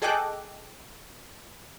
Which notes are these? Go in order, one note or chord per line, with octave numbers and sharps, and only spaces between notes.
G#4 A4 D#5 G5 D6 F#6